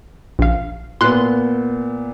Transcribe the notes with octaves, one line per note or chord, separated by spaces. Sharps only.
A#1 F5
A#2 B3 C6 F#6